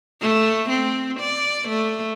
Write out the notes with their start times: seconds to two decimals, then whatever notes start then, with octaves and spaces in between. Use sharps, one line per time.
0.21 A3
0.69 C4
1.20 D5
1.69 A3